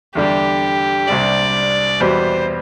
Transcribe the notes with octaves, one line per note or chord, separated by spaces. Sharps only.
E2 D3 G3 D4 G4
C2 C3 G3 D4 D5
E2 B2 G3 B3 C5